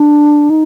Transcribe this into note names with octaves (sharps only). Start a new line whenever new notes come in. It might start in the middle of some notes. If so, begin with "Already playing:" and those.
Already playing: D4
D#4